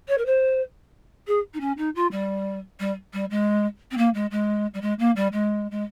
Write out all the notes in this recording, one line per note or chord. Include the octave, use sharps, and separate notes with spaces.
C#5
A#4
C5
G#4
D#4
C#4
D#4
F4
G3
G3
G3
G#3
C4
A#3
G#3
G#3
G3
G#3
A#3
G3
G#3
G#3